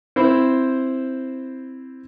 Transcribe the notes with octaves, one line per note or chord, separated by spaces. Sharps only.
C4 E4 C5